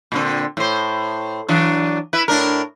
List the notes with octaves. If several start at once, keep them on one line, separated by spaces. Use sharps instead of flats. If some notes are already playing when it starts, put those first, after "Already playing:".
A#2 D3 C4
A2 C5
E3 F#3 D4
E4 B4
A2 D4 A#4